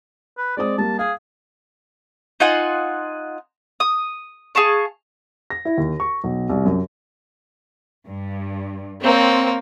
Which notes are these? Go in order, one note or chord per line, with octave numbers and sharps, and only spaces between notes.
B4
G#3 C4 D5 D#6
G3 A#3 A5
G#4 F5
D#4 F4 F#5 G#5
D#6
G#4 F5 A5 C#6
A#6
E4
D#2
C#6
B1
C2
F#2
G2
A#3 C4 C#5